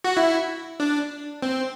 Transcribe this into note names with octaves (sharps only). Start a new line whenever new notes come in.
F#4
E4
D4
C4